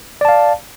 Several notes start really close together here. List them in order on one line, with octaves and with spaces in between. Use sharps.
D5 A5 F5